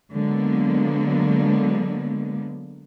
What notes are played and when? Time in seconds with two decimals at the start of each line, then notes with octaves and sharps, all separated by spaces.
0.12 D3 F#3 G#3 A#3 B3